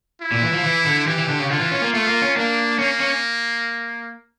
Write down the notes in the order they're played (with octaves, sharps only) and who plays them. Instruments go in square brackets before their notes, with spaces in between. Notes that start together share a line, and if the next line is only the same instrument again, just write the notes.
[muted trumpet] E4
[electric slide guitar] A#2
E3
F3
E3
D3
[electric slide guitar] E3 [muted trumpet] G4
[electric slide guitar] E3
D3
C#3
[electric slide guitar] D3 [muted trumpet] F4
[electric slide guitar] E3
C#4
A#3
[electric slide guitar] A3 [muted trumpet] F4
[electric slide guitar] A#3
C#4
[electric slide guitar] A#3 [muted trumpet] D4
[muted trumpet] A#3 [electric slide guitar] C#4
[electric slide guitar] C#4